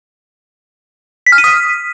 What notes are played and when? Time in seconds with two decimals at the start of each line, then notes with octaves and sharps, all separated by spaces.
1.27 B6
1.32 F6
1.38 D#7
1.44 D#6